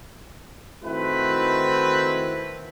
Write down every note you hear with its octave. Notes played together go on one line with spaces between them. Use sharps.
D#3 A3 C4 E4 F#4 B4